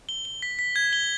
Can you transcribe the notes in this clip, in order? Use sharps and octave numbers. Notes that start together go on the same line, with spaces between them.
G7
G7
B6
B6
G#6
G7